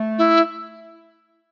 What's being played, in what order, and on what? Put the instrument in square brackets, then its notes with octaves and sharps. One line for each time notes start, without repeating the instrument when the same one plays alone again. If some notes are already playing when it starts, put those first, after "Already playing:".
Already playing: [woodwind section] A3
[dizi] E4